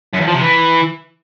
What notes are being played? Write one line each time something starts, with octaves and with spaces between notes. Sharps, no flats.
F#2
E2
F3
C3
E3